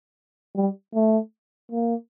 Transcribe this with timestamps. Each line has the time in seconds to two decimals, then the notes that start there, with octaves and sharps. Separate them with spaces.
0.56 G3
0.95 A3
1.72 A#3